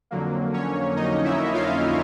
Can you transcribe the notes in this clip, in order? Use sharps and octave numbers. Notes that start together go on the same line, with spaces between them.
F2 D3 F#3 A#3
C#4 C#5
D#4 D#5
E4 E5
F4 F5